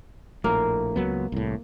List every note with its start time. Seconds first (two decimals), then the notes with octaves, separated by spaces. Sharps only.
0.44 A#1 A2 A#3
0.96 C#2 F#3 B3
1.32 C2 A2